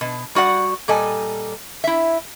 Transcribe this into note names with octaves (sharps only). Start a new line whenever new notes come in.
B2
G3 F#4 D5 F#5
A#2 G3 A4 D#5 G#5
E4 E5